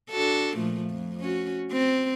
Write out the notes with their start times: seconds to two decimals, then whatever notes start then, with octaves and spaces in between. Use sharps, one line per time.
0.11 D4 F#4 A4
0.57 A#2 F3 A3
0.90 F2
1.21 C#4 F#4
1.72 C4